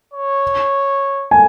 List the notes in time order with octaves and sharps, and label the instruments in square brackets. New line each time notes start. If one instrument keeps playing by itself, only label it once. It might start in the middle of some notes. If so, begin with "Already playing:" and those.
[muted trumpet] C#5
[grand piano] G#5